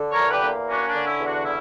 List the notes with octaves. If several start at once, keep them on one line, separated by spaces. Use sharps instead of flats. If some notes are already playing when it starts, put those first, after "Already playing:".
Already playing: D3
A#4 C#5
E2
G4 B4
A#3
C#4 D4 F#4
D4
D3
E4
E2
D4 F#4
C#3 E4